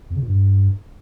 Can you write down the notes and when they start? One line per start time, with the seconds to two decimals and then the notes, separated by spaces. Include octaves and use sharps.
0.10 E2
0.16 C#3
0.22 A#2
0.28 G2